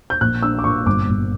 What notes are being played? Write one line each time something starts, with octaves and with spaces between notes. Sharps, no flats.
G6
A#1 F#6
D4 E6
D6
A#2 C#6
G1 D6
G1